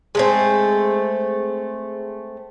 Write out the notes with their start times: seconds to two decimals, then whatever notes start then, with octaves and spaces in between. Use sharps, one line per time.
0.15 G#3 A3 C4